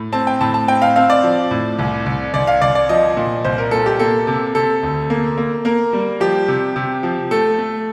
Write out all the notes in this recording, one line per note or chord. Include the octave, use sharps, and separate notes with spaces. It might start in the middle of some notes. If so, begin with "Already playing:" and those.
Already playing: A2
C4 A5
G5
A2 A5
A5
C4 G5
F5
C4 F5
D5
F3
A2
C2
C2
C2 D5
F5
C2 D5
D5
F3 D#5
A#2
C2 C5
A#4
A#2 A4
G4
A#3 A4
C3
C3 A4
D2
A#3
A#3
A#3 A#4
G3
F3 G4
C3
C3
F3
A3 A4
A3